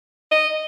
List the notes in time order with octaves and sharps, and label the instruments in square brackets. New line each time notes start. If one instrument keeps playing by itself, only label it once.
[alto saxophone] D#5